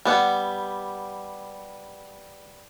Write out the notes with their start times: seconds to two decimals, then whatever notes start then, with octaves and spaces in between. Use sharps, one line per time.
0.05 G3 B3 F#5